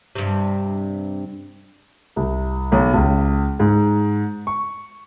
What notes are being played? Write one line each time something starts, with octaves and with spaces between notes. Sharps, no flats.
G2 C3
C2
B1
C#2
G#2
C#6